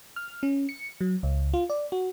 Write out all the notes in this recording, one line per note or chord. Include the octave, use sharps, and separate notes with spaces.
F6
C#4
C#7
F#3
C#2
F4
D5
F#4